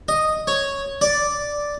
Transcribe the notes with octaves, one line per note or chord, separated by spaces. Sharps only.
D#5
C#5
D5